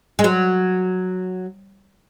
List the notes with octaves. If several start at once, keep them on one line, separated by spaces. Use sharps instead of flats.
G#3
F#3